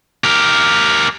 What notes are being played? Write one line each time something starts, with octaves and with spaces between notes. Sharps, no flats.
G4 A#4